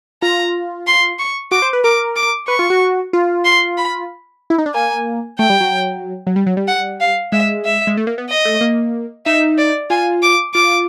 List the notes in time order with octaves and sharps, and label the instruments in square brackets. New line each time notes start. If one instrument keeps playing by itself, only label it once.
[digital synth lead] F4 [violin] A#5
[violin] C6
C#6
[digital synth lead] F#4 [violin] D6
[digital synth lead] C5
B4
[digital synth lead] A#4 [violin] D6
[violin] D6
[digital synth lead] B4 [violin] C#6
[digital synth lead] F4
F#4
F4
[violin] C6
B5
[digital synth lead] E4
D#4
D4
[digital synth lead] A#3 [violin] G#5
[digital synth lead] A3 [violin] G5
[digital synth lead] G3
F#3
F#3
G3
F#3
G3
[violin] F#5
F5
[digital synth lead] G#3 [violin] E5
[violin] E5
[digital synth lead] G#3
A3
A#3
B3
[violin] D#5
[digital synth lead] A3
A#3
[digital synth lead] D#4 [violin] E5
[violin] D5
[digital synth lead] F4 [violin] G#5
[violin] D6
[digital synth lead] F4 [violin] D6